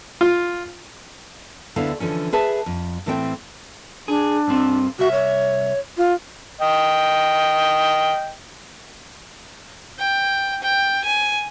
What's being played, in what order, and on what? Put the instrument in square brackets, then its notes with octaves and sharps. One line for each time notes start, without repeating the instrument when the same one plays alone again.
[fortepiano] F4
[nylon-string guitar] D2 D3 B3 E4 F5
D3 E3 F3 C#4
G#4 B4 E5 A5
F2
A2 E3 A3 C4 E5 G5
[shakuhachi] D4 [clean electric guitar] G#4
[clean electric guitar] G2 C4
[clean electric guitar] C2 E5 [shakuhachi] F#4
[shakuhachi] C#5
F4
[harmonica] D#5 G5
[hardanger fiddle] G5
G5
G#5